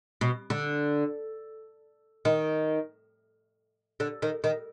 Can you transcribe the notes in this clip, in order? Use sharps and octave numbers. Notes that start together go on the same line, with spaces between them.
B2
D3
D#3
D3
D#3
D#3